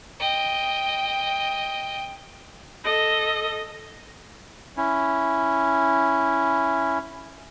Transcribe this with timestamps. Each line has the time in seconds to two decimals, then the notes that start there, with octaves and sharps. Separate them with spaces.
0.20 D#5 G5
2.84 A4 D#5
4.77 C#4 E4